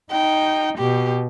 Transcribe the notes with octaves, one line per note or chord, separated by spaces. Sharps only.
D#4 G5
B2 G4